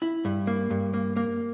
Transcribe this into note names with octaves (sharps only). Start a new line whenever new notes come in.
E4
G2
A#3
G2
A#3
A#3